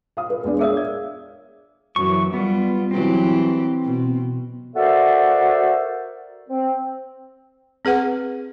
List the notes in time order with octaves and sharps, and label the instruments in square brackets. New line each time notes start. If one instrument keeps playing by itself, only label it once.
[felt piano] F5 D#6
B4
E2 G#3 D4
[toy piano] G#4 A#4 D#6 [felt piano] C#5 E5 F5
[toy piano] D5
[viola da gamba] F#2 [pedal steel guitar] E3 C#6
[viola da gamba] G3 F4 [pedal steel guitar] B3
[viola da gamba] E3 F#3 G4 [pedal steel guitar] C4
[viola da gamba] B2
[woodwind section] F#4 A4 A#4 C5 D5 E5
C4
[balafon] C4 G#4 B4 F#5